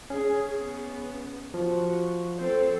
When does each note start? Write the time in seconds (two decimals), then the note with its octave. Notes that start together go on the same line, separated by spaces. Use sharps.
0.10 C#4 G#4
0.58 B3
1.54 F3 F#4
2.39 C4 A4 C5